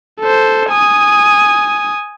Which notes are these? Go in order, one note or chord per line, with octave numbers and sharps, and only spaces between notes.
A4 C5
G#5 D#6